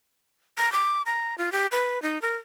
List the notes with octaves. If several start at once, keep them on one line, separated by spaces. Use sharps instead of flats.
A#5
D6
A#5
F4
G4
B4
D#4
A#4